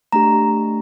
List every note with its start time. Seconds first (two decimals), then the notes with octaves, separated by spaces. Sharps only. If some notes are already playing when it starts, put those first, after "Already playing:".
0.12 A3 D4 G4 A#5